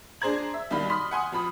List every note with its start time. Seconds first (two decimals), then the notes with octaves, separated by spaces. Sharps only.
0.21 D4 G#4 C5 A#5 G#6 F#7
0.54 E5
0.70 B1 D#3 G3 F5 B5
0.90 B5 C6 D#6 F6 B6
1.11 F#5 G#5 C6 D#6
1.32 F2 F3 B5 D#6